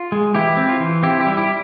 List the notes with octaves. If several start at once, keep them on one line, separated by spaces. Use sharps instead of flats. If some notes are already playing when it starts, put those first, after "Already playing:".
Already playing: F4
G#3
E3 E4 G4
C4
F4
E3
C4 E4 G4
E4 G4
G3
E4 G4